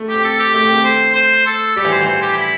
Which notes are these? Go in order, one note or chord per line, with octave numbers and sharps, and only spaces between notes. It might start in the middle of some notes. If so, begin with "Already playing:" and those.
Already playing: A3
G4
C4
A4
G4
A3 G4
C4
A3
C5
C5
A4
G3 G4
E3
C5
E3
C5
G4
G4
E4